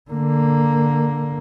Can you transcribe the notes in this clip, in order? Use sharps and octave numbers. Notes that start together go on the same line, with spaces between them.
D3 A#3